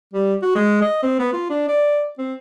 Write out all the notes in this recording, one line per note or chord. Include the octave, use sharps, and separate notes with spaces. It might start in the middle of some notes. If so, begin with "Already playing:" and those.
G3
F#4
G#3
D#5
C4
B3
F4
D4
D5
C4